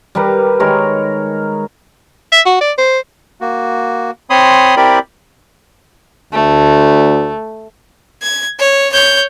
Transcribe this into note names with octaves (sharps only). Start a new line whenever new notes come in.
G3 G4 A#4 B4
D#3 G#3 A#4 C#5
E5
F#4
D5
C5
A#3 F#4
C4 C#5 B5 C6 D#6
C4 E4 G4 A#4 D5 B5
D2 A3
G#6
C#5
C#5 G6